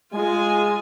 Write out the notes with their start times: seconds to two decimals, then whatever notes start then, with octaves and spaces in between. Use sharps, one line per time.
0.13 G#3 F4 G#5